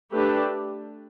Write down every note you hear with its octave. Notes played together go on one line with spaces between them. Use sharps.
A3 D4 G4 B4